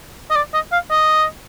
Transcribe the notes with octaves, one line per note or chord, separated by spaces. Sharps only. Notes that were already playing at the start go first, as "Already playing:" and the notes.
D#5
D5
D#5
F5
D#5